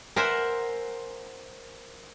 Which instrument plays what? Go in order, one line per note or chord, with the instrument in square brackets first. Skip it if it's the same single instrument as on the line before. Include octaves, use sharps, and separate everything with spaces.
[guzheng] A#4 C5 E5 F#5 G#5